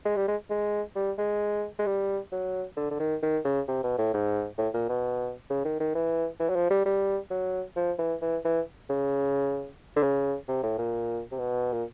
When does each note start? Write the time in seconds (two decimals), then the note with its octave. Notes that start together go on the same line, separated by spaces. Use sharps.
0.05 G#3
0.16 G3
0.28 G#3
0.50 G#3
0.96 G3
1.18 G#3
1.79 G#3
1.86 G3
2.32 F#3
2.77 D3
2.91 D3
3.00 D#3
3.23 D#3
3.45 C#3
3.68 C3
3.83 B2
3.98 A2
4.14 G#2
4.58 A2
4.74 A#2
4.89 B2
5.50 C#3
5.64 D#3
5.80 D#3
5.95 E3
6.40 E3
6.50 F#3
6.55 F3
6.70 G3
6.86 G3
7.30 F#3
7.76 F3
7.99 E3
8.21 E3
8.45 E3
8.90 C#3
9.96 D3
10.03 C#3
10.48 C3
10.63 A2
10.78 A#2
11.32 C3
11.39 B2
11.73 A#2